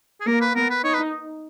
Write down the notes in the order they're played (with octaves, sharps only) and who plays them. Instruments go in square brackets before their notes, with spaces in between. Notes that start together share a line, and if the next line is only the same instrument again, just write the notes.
[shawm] G#4
[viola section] A#3 [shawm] A#4
[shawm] B4
[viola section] B3 [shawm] A#4
[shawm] B4
[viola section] D#4 [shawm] C#5
[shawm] B4